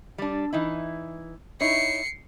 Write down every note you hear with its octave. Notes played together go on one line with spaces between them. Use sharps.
G3 D4
E3 D#4 E4
D#4 E4 C#5 C7 C#7